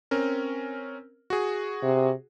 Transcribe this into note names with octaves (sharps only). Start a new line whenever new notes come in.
C4 C#4 A#4
F#4 G#4
C3